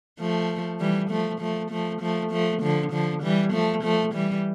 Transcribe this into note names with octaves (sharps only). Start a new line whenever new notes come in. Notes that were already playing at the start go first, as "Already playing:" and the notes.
F3 A3
E3 G3
F3 A3
F3 A3
F3 A3
F3 A3
F3 A3
D3 F3
D3 F3
E3 G3
F3 A3
F3 A3
E3 G3